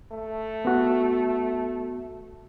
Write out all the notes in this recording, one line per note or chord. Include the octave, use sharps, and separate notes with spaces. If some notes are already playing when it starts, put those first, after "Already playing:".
A3
B3 F#4